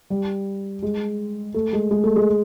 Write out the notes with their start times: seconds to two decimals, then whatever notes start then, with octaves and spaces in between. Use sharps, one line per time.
0.10 G3
0.82 G#3
1.54 A3
1.73 G#3
1.91 G#3
2.04 A3
2.16 G#3